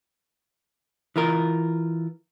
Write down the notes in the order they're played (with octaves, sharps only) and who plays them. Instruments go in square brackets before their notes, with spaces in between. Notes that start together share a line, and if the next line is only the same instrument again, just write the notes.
[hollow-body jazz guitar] E3 F4 A#4